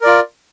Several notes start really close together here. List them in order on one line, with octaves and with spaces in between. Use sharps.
A#4 D5 F4